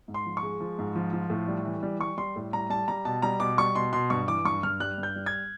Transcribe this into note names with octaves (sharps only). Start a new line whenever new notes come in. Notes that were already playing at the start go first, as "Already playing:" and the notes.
G#2
C6
F3
C#6
G#3
F3
G#2
F3
F3
A2
G3
E3
G3
G3 C#6
G3 C6
A2
G3 A#5
G3 A5
G3 A#5
B2 A5
G3 A#5
B2 D6
G3 C#6
B2 C6
B2 C6
G2 C#6
E3 D6
G2 C#6
G2 F6
G3 F#6
G2
G6
G3
G#6